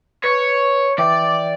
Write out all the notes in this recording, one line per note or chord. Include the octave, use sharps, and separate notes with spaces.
B4 C#5
E3 D5 E5 G5